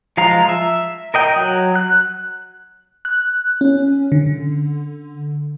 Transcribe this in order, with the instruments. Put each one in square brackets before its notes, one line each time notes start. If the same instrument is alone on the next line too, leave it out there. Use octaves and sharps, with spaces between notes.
[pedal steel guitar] F3 G#3 F5 A#5
E5
A#4 D#5 G5
F#3
F#6
[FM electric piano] F#6
C#4
D3